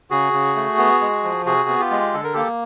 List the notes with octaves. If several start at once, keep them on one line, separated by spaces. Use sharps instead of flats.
C#3 F#4 G#4
C#3
A3
B3
G#3
F3
C3 F#4 G#4
B3
F4 G4
G#3
D3 A4
A#4
A#3 G4 A4